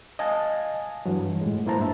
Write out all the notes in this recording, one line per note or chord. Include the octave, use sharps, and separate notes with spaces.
D#5 F5 G#5 A5 D#6
G2 E3 F#3
A2 G#3
A#3 E4 A#4 C5 A5 A#5
G2 E5